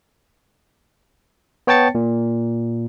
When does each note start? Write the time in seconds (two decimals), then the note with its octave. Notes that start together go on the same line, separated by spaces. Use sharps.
1.67 B3 C#5 G5 A5 A6 C#7
1.95 A#2